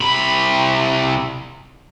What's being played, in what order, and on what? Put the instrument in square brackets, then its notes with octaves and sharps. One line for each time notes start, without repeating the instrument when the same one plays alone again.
[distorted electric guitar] C2 B5